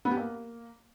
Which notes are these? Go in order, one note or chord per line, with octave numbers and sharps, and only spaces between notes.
B3
G4
A#3